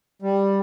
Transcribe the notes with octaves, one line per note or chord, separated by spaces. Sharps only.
G3